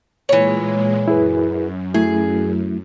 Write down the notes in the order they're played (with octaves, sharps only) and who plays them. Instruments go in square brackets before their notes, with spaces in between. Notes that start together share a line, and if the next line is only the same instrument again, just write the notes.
[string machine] A#2 G#3 [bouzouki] E3 C#5
[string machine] F#2 [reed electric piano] E4 G#4 B4
[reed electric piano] F#3 A3 E4 [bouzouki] G#4